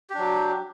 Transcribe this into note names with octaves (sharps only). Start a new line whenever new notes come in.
F#3 D4 G4